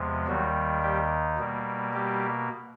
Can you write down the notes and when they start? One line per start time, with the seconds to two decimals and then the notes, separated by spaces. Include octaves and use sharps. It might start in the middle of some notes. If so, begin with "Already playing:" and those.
Already playing: E2 C3 F3 G#3
0.27 D#2 D#3 F#3 G3 F#4
0.83 G3 G4
1.38 B2 G3 A#3
1.94 G3 G4